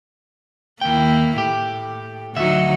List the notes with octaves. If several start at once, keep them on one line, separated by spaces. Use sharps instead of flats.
D#2 A#3 E4 G5
A2 G4
D2 F#3 D#4 F#4 E5